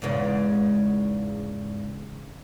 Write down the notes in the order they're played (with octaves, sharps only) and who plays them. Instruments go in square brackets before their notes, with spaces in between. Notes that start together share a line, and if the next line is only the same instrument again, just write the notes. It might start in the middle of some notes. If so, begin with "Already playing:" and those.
[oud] E2 G#2 C#3